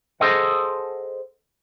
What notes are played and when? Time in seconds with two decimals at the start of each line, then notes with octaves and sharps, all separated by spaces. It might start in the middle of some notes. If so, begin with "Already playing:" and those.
0.20 G#4 A4 C5 D#5 F#5